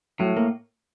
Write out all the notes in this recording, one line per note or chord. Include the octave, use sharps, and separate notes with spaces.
A2 F#3
A#3